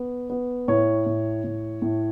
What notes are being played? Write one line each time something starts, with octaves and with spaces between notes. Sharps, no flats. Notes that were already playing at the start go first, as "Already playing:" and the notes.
Already playing: B3
B3
A2 C#5
A2
A2
A2